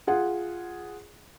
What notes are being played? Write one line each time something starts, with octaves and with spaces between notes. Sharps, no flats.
F4 G#4 F#5